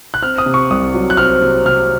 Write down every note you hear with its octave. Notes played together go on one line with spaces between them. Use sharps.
F#6
C4 F6
D#6
C3
C#6
C2 D#6
F#3
F#6
C4 F6
C3
C3 F6